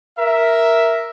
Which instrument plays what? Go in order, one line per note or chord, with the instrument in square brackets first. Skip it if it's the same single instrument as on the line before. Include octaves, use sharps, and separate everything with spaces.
[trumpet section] A#4 E5